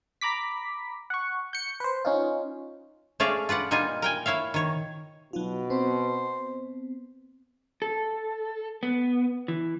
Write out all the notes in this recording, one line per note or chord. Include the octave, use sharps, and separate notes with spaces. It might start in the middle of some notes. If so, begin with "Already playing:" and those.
A#5 B5 D6 B6
F#5 C#6
G6 C#7
B4 C5
C#4 D#4 F4
A3 C#4 G#4 D5 E5 F5
F4 B4 D5 F#5
A#2 G3 D#4 F4 D#5 G#5
A#4 G5 G#5
E4 C#5 E5 F5
D#3 C#5
B2 F#3 D#4 F4
B3 C4 C5
A4
B3
E3